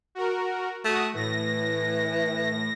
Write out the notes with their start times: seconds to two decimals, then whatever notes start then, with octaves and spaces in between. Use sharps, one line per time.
0.15 F#4 A#4
0.85 A3 F#4 D#6
1.15 A2 E3 A#6